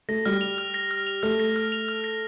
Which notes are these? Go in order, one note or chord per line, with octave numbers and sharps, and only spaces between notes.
A3 A#6
G3 F6
F7
F6
A#6
F6
F7
A3 F6
A#6
F6
F7
F6
A#6